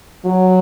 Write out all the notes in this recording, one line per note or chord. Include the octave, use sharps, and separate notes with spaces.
F#3